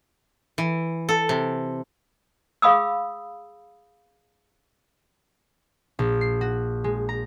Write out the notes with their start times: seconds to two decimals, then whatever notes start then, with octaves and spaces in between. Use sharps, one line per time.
0.58 E3
1.09 A4
1.29 C3
2.62 G#4 F5 B5 D#6 E6
5.99 A#1
6.21 C7
6.41 F#4
6.84 G#3
7.09 A#5